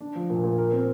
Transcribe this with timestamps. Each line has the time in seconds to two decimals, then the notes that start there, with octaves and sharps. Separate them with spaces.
0.01 D4
0.15 F3
0.30 A#2
0.43 A#2
0.58 A#4
0.72 C4